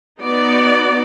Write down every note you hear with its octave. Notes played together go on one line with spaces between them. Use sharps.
B3 D#4 F#4 D5